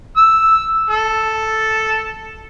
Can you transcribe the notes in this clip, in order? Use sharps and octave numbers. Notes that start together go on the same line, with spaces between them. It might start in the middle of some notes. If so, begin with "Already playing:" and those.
E6
A4